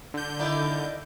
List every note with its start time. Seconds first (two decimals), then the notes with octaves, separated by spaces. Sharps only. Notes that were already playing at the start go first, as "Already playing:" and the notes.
0.14 D3 G6
0.39 D#3 E4 D5